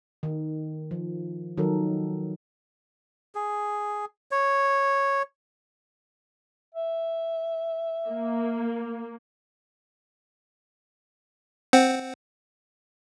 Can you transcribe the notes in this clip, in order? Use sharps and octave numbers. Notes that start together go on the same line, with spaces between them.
D#3
F3
D#3 F#3 A4 A#4
G#4
C#5
E5
A#3
C4 C5 F#5